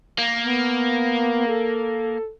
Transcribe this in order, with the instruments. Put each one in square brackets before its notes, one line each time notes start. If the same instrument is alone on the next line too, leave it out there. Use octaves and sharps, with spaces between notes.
[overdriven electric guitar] A#3
[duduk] B3
A4